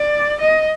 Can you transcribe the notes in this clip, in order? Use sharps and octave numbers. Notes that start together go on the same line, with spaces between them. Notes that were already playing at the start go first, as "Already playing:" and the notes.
Already playing: D5
D#5